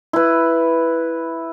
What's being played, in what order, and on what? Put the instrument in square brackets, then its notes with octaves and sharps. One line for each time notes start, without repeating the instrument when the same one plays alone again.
[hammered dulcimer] E4 B4